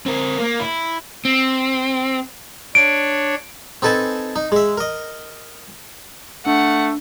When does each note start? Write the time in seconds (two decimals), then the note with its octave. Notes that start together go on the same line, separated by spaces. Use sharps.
0.06 C4 A#4
0.40 A#3
0.60 E4
1.25 C4
2.75 D4 C#5 D7
3.82 C4 D#4 A4 B4 G#5 A5
4.36 D#4
4.52 G#3 E5
4.78 A#4 D#5
6.46 A3 D4 F#5